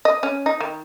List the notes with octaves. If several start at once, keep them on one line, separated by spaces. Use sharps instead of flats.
D#5
C#4
D#4
D#3